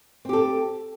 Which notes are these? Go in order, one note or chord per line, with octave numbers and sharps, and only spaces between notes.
C4 G4 A4